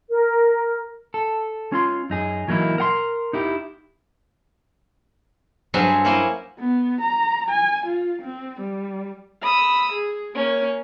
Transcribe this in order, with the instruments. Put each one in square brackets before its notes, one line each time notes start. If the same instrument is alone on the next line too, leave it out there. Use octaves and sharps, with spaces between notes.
[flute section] A#4
[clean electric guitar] A4
C#4 F4 C6
F#2 D#4 G#4
E3 F#3 A#3 D#4 E4
A#4 F#5 C6
D#4 E4 G4
[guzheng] G2 F#3 C4 G#4 E5 G#5
A#3 C#4 E4 G#5
[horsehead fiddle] B3
A#5
G#5
F4
C4
G3
[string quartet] B5 D#6 E6
G#4
A#3 C#4